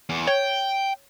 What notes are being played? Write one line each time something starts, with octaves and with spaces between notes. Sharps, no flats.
E2
C#5 G5